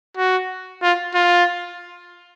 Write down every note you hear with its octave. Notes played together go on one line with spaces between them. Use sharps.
F#4
F4
F4